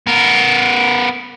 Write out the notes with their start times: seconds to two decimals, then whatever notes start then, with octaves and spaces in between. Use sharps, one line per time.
0.07 B3 A#4